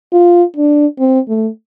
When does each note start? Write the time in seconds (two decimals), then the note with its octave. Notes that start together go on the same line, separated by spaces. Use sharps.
0.13 F4
0.56 D4
0.99 C4
1.28 A3